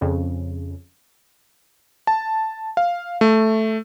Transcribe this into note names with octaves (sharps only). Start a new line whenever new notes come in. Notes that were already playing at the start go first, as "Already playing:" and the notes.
F2 C#3
A5
F5
A3